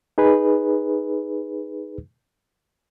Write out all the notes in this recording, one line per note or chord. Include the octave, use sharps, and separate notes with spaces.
D#4 G#4 B4